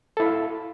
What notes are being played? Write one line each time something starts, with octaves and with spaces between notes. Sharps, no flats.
E4 A4 E5 F5